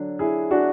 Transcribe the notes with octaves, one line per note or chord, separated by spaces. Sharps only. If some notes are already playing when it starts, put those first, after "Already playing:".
Already playing: D3 F#3 D4
E4 G#4
D4 F#4